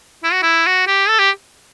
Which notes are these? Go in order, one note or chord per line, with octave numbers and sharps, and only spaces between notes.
E4
F#4
E4
F#4
G4
A4
G4